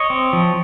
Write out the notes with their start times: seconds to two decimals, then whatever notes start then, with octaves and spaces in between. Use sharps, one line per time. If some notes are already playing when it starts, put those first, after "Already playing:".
Already playing: C#5 D#5
0.10 C4
0.33 F3